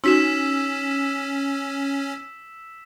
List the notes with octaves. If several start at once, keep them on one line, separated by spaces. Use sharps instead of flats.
C#4 D#4 F#4 E6 B6 E7